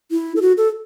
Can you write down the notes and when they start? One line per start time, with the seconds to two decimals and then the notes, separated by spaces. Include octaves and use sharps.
0.11 E4
0.36 A4
0.42 F#4
0.57 A4